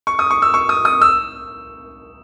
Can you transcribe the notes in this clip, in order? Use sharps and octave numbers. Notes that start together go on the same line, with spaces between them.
C#6
D#6
C#6
E6
C#6
D#6
D#6
E6